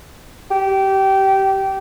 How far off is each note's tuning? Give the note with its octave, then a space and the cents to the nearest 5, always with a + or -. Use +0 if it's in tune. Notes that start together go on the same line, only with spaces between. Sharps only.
G4 -20